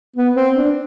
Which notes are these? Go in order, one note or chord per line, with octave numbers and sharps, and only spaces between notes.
B3
C4
D4